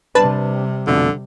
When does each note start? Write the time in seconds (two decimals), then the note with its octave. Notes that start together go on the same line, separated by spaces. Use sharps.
0.15 C3 G3 D4 B4 C5 A5
0.87 F2 B2 D3 A3